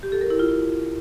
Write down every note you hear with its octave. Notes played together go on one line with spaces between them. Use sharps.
G4
A4
A#4
E4
F4